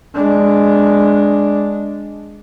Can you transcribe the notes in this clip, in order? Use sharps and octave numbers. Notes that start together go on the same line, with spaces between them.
G#3 D4